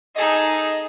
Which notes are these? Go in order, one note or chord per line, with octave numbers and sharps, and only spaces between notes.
D#4 G#4 A4 D#5